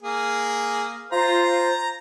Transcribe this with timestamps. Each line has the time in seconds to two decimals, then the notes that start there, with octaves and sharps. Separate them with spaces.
0.02 A#3 G#4
1.12 F4 C5 A#5